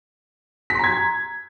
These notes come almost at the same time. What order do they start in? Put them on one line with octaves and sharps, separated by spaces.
B6 C6 A#5 G#6